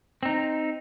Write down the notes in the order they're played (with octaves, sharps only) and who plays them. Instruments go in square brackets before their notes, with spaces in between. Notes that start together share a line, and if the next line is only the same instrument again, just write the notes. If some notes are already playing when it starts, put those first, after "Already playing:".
[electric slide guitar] C4 D#4